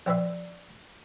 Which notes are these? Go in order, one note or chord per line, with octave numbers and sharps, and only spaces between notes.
A#1 C4 B4 D5 E5 C6